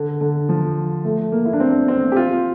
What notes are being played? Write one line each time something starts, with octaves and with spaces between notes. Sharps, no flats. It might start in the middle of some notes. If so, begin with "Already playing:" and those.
Already playing: D3
D3
F3
A3
A#3
E4
D4
C4
C4
G4
F4